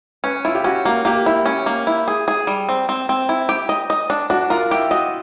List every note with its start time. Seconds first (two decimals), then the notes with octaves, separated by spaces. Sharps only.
0.24 C#4 B4
0.45 E4 F4
0.55 G4
0.64 C#4 F#4
0.85 A#3 F#4
1.05 A#3 G4
1.26 E4
1.46 C#4
1.66 A#3
1.87 E4
2.08 G#4
2.28 G#4
2.47 G3
2.69 C4
2.89 C4
3.09 C4
3.29 E4
3.49 G4
3.69 D#5
3.90 D#5
4.10 D4
4.30 D4 F#4
4.50 F4 A#4
4.71 E4 G4
4.91 F#4 D#5